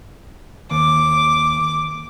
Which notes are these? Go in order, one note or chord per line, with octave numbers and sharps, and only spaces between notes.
D#2 D6